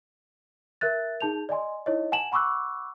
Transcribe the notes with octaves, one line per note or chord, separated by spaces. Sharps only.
A#4 E5 F#6 A6
D#4 G#4 A5 G6 F7
D5 D#5 G#5 C6
D#4 E4 C#5 D#5
F#5 G#5 A5 E7 F#7
F#5 B5 C#6 D6 E6 F#6